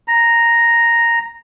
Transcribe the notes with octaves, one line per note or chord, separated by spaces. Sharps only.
A#5